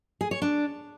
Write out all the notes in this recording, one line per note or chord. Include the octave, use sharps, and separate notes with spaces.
G#4
C#5
D4